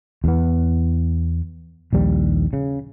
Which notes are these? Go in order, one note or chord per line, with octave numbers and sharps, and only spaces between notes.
E2 B3
A#1 D#2 G3
C#3